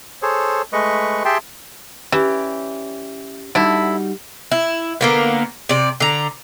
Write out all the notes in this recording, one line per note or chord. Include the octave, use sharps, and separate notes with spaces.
G#4 A4 C5 C#5
G#3 A3 B4 D#5 C#6
G4 G#4 E5 G5 A5 C6
E3 C#4 G4 D5
D3 G3 D#4 E4 F#4
E4
D3 A#3 B3
C3 D5
D3 A#5